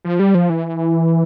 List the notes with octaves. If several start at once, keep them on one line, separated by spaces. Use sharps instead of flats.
F3
G3
F3
E3